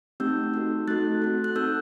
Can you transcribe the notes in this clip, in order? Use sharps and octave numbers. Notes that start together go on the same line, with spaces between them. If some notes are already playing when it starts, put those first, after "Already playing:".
A3 C4 D#4 G4 E6 G6
D#4 F#4 A4
A3 D#4 F#4 A4 F#6 A6
C4 F#4 A4
F#6
C4 D#4 A4 E6 G6